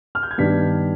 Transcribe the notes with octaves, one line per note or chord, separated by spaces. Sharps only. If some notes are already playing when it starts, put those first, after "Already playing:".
F6
G6
G#6
G2 D#3 B3 D4 B6